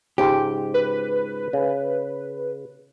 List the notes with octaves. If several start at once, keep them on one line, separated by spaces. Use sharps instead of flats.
C#2 G#2 G4 G5
B4
C#3